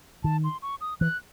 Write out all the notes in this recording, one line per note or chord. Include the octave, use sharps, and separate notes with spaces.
D#3 A5
C6
C#6
D#6
E3 F#6